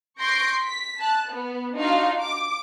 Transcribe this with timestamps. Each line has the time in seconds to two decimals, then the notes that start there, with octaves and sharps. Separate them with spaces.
0.19 C6 C#6 G6 A#6 C7 D7
0.62 B6
1.00 A5 F#6
1.30 B3
1.76 D4 D#4 F4 F#4 F5
2.20 D6